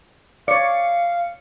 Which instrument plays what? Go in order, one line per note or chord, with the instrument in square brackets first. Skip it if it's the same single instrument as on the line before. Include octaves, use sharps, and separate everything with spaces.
[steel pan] C#5 D5 [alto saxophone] F5 [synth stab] C#7